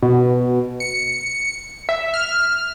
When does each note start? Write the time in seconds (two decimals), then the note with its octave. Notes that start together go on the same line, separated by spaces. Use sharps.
0.02 B2
0.80 C#7
1.89 E5
2.14 F6